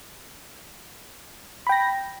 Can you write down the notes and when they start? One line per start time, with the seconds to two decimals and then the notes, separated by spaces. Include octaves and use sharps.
1.67 B5
1.69 G5
1.72 A#6